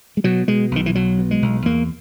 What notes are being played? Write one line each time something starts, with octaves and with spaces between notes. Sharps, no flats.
G#3
B2 F#3
B2 G#3
B1 D#3
E3
B1 F#3
B2
G#3
B1
E2 A#3